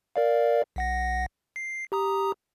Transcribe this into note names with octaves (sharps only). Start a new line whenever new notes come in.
A#4 D5 F5
B1 F#5 A#6
C7
G4 A#5 D#6